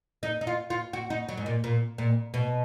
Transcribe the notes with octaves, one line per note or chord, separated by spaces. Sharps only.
D#4
D#4
F4
F4
F#4
D#4
F#3
G#2
A#2
A#2
A#2
B2